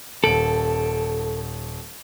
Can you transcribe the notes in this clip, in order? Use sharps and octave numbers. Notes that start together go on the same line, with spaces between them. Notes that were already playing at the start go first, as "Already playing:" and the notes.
D#1 A4 D7 F#7